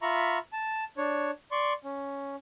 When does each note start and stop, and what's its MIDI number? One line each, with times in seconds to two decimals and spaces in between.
0.02 0.38 65
0.02 0.38 76
0.02 0.38 82
0.02 0.38 83
0.02 0.38 85
0.53 0.84 81
0.97 1.31 62
0.97 1.31 73
1.51 1.73 74
1.51 1.73 84
1.51 1.73 85
1.84 2.36 61